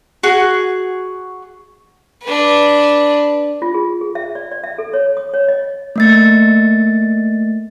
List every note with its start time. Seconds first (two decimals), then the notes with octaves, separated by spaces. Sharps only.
0.23 F#4 G#4
2.23 D4 B4
3.62 F4
3.74 G#4
4.01 G#4
4.15 E5
4.35 D5
4.52 D5
4.64 E5
4.78 A4
4.94 C#5
5.17 D#6
5.34 C#5
5.48 D#5
5.96 A3 A#3 A6